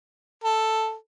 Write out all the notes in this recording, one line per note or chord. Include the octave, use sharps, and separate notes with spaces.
A4